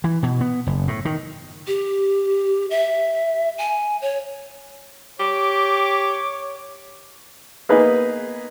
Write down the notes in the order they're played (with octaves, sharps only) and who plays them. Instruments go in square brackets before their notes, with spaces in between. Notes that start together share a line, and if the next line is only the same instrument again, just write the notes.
[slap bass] E3
B2
B3
F#1
A2
D#3
[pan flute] G4
E5
G#5
C#5
[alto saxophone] G4 [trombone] C#5 [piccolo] D6
[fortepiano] A#3 B3 D#4 G#4 B4